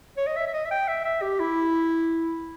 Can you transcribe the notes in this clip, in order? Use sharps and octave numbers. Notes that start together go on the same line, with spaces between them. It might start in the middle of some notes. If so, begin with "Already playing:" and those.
C#5
D#5
E5
E5
D#5
E5
G5
E5
E5
G4
E4